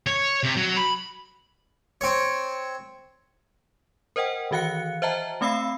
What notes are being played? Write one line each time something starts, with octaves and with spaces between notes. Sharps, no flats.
C#5
C3
F#3
B5
C4 C#5
A#4 C5 D#5 F#5 G5
D#3 E3 F#4 F5 F#6 C#7
C5 D#5 E5 G5 A5 A#5
A3 C4 F5 B5 E6 C7